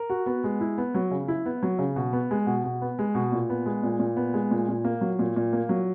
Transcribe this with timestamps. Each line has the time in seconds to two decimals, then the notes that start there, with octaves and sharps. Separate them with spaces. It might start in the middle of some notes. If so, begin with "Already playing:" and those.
Already playing: A#4
0.10 F#4
0.26 B3
0.44 G#3
0.61 E4
0.78 B3
0.95 F#3
1.11 C#3
1.28 E4
1.46 B3
1.63 F#3
1.79 C#3
1.96 B2
2.13 B3
2.31 G#3
2.47 B2
2.64 B2
2.81 B3
2.99 G#3
3.15 B2
3.32 A#2
3.49 B3
3.66 G#3
3.83 A#2
3.99 A#2
4.16 B3
4.34 G#3
4.51 A#2
4.68 A#2
4.85 A#3
5.01 F#3
5.19 A#2
5.36 A#2
5.53 A#3
5.69 F#3